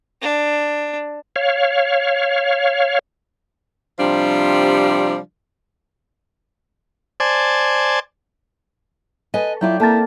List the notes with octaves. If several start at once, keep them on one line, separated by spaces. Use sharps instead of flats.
D4
C#5 F5
C3 F3 G3 D4
C5 D5 G#5 A5
A4 B4 D#5 G#5
F#3 E4 F4 D5 G5
A#3 C4 E4 A4 A#4 A5 A6